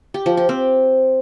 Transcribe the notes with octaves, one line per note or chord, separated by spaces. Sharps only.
G4
F3
G4
C4